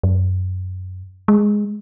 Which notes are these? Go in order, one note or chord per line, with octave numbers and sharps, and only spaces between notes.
F#2
G#3